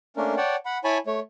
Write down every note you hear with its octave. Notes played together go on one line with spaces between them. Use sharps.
A3 A#3 C#4 D4 A#4
C#5 D5 F#5 G5 A5
F#5 B5
E4 C#5 G#5 A5 B5
A3 C#5